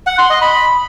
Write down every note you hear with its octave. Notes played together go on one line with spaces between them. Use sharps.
F#5
C6
D#5
B5